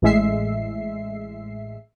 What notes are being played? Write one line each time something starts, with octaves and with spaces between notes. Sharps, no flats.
A1 A2 G#3 E5 C7